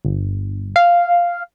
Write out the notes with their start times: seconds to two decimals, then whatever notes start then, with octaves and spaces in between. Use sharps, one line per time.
0.05 G1
0.76 F5